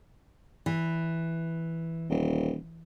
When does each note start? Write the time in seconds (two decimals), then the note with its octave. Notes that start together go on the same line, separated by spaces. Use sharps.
0.66 E3
2.10 D#1